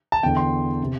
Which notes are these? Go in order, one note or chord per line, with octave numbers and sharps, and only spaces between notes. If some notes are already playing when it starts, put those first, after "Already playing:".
A5
E2 D3 G5
C6
C3